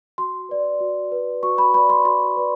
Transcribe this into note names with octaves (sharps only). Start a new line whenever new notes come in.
F#4 C6
B4 D5
F#4
B4 D5
F#4 C#6
B5
B4 D5 B5
C6
F#4 C6
B4 D5